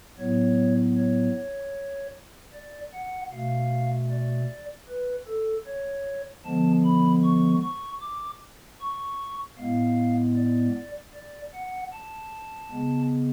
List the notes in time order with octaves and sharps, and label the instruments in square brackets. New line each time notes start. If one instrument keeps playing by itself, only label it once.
[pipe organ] A2 F#3 B3 C#5
C#5
D5
F#5
B2 A3 F5
D5
B4
A4
C#5
D3 F3 G#3 B3 A5
B5
C#6
C#6
D6
C#6
A2 G#3 B3 F5
D5
D5
F#5
A5
C#3 G#3 B3